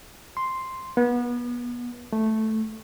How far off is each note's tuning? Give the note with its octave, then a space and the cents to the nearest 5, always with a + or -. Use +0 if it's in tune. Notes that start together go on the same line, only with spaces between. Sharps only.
C6 +0
B3 -30
A3 -5